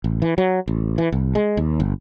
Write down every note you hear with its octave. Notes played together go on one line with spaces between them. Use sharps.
A1
E3
F#3
A1
E3
C2
G#3
D#2
G1